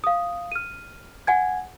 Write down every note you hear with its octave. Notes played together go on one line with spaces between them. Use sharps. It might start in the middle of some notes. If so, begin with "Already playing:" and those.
F5 D#6
F6 D#7
F#5 G#5 G#6